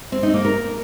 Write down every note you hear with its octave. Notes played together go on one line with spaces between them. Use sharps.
C4
D#4
A#3
A#4